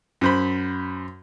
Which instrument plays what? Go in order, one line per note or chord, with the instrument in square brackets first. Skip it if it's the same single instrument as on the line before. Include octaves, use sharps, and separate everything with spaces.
[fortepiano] F#2 C5 B5